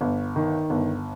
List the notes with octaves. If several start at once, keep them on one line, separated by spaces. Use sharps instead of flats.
G1
D#3
G1